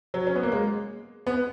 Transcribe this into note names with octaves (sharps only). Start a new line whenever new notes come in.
F#3
C#4
B3
A#3
G#3
B3